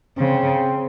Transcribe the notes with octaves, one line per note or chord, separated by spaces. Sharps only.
C#3 C4